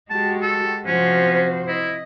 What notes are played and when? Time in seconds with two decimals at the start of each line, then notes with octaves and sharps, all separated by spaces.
0.10 G#3 F#4 G4 A5
0.42 A4
0.86 C3 F3 C#4 F#4 C5
1.68 E4 D#5